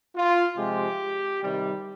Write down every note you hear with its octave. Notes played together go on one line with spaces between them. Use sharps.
F4
C3 F3 G#3 G4
C3 D#3 G3